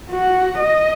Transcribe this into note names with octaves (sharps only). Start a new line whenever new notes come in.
F#4
D#5